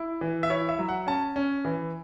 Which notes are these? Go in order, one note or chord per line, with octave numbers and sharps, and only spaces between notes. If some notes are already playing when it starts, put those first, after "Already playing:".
Already playing: E4
E3
E5
E4 C#5
E5
F#3
F#5
C#4 A5
C#4
E3